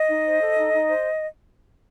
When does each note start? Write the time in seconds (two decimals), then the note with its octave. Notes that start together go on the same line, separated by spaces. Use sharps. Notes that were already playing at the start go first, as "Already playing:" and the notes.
Already playing: D#5
0.09 D#4
0.25 C5
0.41 A4
0.57 D#4
0.73 D#4
0.88 C5